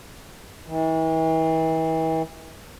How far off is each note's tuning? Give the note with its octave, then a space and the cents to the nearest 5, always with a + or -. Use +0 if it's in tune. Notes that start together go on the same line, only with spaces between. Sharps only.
E3 -40